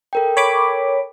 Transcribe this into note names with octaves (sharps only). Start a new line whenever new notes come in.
A4 A#4 G5
C#5 B5 D6